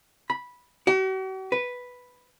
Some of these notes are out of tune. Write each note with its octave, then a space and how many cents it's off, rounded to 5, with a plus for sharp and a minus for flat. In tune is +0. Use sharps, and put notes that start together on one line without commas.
B5 -10
F#4 +45
B4 +0